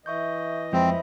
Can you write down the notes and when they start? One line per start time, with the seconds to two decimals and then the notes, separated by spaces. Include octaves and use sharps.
0.06 E3 D#5 E5 C#6 G6
0.73 F2 F3 G#3 C4 C5 E5 B5